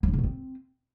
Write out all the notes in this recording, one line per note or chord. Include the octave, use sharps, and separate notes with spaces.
F#3
D4
C#3
B2
C4